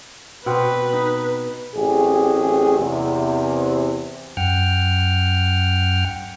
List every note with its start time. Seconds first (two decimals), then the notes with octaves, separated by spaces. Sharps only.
0.46 B2 C4 B4 F#5
0.93 D#4
1.75 A1 F#3 C4 G4 G#4
2.77 E2 C3
4.37 F#2 F#5 G5 F6